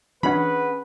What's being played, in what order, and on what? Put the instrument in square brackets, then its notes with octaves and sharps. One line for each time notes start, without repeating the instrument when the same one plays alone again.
[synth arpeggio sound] E3 D4 [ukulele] C#4 G#4 F#5 [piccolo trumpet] B4 [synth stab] B5